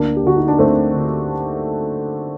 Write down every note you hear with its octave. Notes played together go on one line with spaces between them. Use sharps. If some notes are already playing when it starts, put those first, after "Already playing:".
Already playing: D2 A#3 D4
G4
D3 F#4
D#4
D4
D2 A3 C4
D3